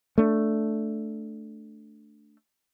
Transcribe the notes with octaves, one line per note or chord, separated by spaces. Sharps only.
A3 D4